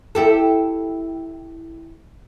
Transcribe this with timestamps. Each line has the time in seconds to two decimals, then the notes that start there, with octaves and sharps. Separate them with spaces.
0.15 E4 G4 A4